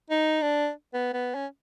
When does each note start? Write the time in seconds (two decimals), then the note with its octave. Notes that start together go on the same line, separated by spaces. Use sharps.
0.10 D#4
0.42 D4
0.94 B3
1.13 B3
1.35 C#4